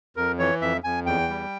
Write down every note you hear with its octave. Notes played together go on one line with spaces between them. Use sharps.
F2 A#4
E3 C#5
F2 E5
F2 G#5
E2 G5
G3